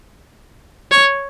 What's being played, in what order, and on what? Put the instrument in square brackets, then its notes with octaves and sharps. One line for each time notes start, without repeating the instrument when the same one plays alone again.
[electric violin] C#5